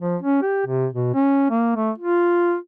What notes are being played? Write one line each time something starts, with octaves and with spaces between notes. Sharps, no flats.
F3
C#4
G4
C3
B2
C#4
A#3
A3
F4